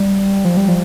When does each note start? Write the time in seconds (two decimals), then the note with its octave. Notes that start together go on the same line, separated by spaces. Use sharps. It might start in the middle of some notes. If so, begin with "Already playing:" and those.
Already playing: G3
0.45 F3
0.57 G3
0.68 F3